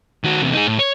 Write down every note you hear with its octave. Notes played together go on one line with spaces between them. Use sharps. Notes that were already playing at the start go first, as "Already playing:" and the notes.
D#3 F#4
E2 C3
D#4 G#4
A2
C#5